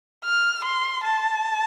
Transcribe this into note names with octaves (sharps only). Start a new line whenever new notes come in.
F6
C6
A5